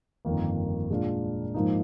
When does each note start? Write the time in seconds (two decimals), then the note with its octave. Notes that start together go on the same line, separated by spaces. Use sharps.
0.25 G1 F2 D#3 A#3
0.90 A#2 G#3 D4 F4
1.54 G#2 F3 A#3 D#4